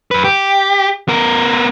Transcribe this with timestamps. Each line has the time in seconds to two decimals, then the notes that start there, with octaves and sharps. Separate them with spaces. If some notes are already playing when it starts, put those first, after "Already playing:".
0.11 F#2 B4
0.24 G4
1.08 B3 A#4